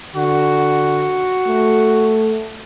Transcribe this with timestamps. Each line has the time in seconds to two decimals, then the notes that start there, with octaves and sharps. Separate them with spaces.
0.15 D3 F#4
1.47 A3